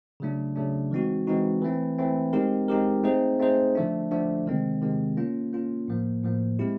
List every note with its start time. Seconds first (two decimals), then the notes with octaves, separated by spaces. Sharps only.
0.20 C#3 F#3 A3 D4
0.56 C#3 F#3 A3 D4
0.91 E3 G#3 C4 D#4 F#4
1.27 E3 G#3 C4 D#4 F#4
1.62 E3 A3 C4
1.98 E3 A3 C4
2.33 G#3 C4 D#4 G4 A#4
2.68 G#3 C4 D#4 G4 A#4
3.04 A3 C4 D#4 G#4 C5
3.39 A3 C4 D#4 G#4 C5
3.75 D3 F3 A3 D4
4.11 D3 F3 A3 D4
4.46 C3 D#3 G#3 C4
4.82 C3 D#3 G#3 C4
5.17 A#3 C#4 F4
5.53 A#3 C#4 F4
5.88 A2 F3 A#3
6.24 A2 F3 A#3
6.59 G#3 C4 E4 G4